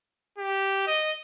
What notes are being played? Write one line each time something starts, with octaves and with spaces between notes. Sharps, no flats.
G4
D#5